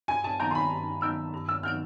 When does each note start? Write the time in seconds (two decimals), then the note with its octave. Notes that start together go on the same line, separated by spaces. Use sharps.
0.08 G2 G#5
0.24 A5
0.40 D#3 F#3 B3 D#4 A#5
0.51 C6
0.55 B5
0.70 G2
1.01 D#3 F#3 B3 D#4 E6
1.33 G2
1.49 E6
1.63 D#3 F#3 B3 D#4 F6